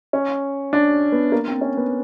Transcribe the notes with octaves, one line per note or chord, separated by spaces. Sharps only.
C#4
D4
B3
A#3
C4
C#4
B3